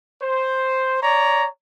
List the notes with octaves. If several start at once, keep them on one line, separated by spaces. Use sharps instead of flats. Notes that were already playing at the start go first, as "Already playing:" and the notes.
C5
C#5 D5 A#5